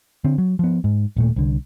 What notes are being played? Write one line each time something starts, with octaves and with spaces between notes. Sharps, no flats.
D3 C4
F#3
F3 B3
G#2
D#1 A#2 A3
C2 D3